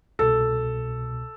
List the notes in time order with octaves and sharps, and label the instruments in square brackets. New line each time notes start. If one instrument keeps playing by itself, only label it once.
[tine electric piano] C2 B2 [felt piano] A4